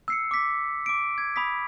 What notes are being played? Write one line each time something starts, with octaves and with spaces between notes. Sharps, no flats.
E6 C7 C#7
D6 B6
D6 D7
G#6
B5 D#6 B6